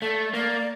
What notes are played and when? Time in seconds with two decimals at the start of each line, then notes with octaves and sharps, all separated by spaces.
0.02 A3 D5
0.33 A#3 D5